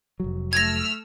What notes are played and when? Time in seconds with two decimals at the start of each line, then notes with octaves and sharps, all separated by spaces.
0.20 F1 F#3
0.53 A3 E6 F6 G#6 A#6